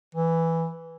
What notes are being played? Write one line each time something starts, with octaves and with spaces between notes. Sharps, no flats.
E3